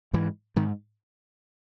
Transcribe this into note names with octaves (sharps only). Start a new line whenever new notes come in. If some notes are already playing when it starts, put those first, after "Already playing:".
G#2 E3
G#2 D#3